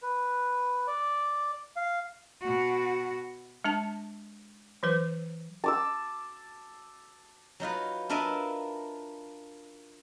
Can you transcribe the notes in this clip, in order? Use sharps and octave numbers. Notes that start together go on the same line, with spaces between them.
B4
D5
F5
B2 F#4
G#3 D4 A5
E3 F#3 B4 C5
A5 D6 E6
F#3 D#4 F4 B4
D4 F4 A#4 B4 D#5 E5